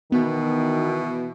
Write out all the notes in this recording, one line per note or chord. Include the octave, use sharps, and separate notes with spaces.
B2 D#3 E3 B3